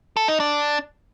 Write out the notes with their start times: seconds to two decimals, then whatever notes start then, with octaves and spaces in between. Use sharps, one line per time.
0.17 A4
0.28 D#4
0.40 D4